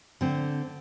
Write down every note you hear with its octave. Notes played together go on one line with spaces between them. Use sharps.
D3 C4